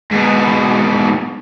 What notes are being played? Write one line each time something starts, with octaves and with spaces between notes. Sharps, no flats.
G#2 B2